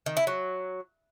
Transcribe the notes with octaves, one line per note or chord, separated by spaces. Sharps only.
D#3
E4
F#3